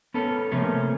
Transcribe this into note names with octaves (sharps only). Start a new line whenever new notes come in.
B3 C#4 A4
C3 F3 A3 A#3 C#4 G#4